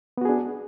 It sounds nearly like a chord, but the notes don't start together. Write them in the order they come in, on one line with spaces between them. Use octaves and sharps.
B3 F#4 G#4 D4